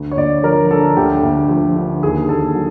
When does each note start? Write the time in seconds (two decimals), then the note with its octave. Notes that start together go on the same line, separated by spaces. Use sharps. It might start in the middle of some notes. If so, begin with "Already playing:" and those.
Already playing: D2
0.11 C#5
0.17 D2 D5
0.43 F3 A#4
0.71 D3 A4
0.97 D2 G4
1.23 D2
1.49 F3
1.76 D3
2.03 D#2 G#4
2.29 D#2 A4
2.55 F#3